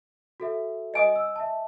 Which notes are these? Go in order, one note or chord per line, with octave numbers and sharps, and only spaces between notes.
F#4 A4 E5
D#5 G#5 D#6
E6
E5 A5